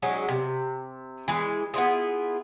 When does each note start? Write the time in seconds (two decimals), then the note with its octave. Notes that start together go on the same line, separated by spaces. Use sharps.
0.02 F#3 G#3 C#4 D#4
0.29 C3
1.28 E3 G#3
1.74 B3 E4 F4 G#4